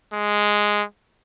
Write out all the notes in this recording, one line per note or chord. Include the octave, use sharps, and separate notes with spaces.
G#3